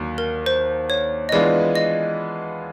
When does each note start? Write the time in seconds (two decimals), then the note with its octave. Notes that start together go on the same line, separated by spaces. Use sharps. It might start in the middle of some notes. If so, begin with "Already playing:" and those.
Already playing: D#2 D3 F#3 A#3 D4
0.18 A#4
0.46 C5
0.90 C#5
1.29 D#5
1.32 E3 G#3 B3 D4 F4 D5
1.76 D#5